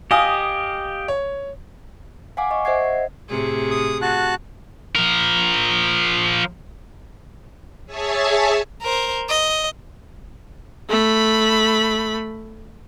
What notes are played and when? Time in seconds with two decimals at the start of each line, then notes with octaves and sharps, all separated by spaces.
0.11 G4 D#5 F5 G#5 D#6
1.08 C#5
2.37 F5 F#5 G#5 D6
2.51 D#5 C#6
2.65 C5 D#5 E5 F#5 G#6 C7
3.28 A2 C3 G#4
3.71 D#6
4.02 F#4 A5 F#6
4.96 F3 A#4
7.86 G#4 C#5 E5 G#5 A5
8.82 A#4 C5
9.29 D#5
10.89 A3 B5